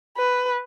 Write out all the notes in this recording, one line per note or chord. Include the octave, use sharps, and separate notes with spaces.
B4